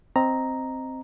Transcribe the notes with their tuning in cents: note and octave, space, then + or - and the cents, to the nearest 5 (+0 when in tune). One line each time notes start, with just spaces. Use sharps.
C4 +0 D#5 +0 A#5 +0